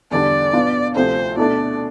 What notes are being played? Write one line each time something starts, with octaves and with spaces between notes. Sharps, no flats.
E2 D3 G3 D4 D5
B2 B3 D4 F4
D2 C3 F3 A3 C4 C5
B2 A3 D4 D5